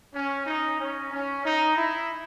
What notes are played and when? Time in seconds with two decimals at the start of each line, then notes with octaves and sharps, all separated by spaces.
0.14 C#4
0.47 D#4
0.79 C#4
1.12 C#4
1.45 D#4
1.77 E4